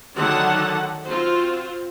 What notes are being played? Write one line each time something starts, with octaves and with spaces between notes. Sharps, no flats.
D3 D#3 F#3 A3 F#5 A5
C4 F4 F#4 C5